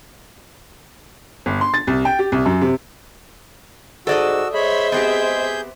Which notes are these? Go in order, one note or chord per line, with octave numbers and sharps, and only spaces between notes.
G1
C6
A6
C2
G5
G4
C2
F#2
C3
G#2 F#4 A4 D5 D#5 E6
G#3 C5 C#5 E5 B5
B3 C4 G4 G#4 G6